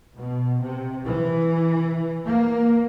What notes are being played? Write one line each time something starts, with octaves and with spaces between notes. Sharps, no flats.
B2
C3
E3
A#3